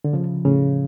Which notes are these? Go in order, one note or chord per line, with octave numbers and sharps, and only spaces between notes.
D3
C#3 F3
A2 C#3